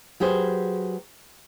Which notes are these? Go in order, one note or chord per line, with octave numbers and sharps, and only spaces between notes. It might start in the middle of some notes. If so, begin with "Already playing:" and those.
F#3 G4 G#4 B4 C5